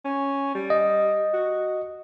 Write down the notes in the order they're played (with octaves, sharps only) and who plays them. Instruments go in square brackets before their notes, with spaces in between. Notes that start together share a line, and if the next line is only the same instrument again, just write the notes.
[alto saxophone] C#4
G3
[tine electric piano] D#5
[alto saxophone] F#4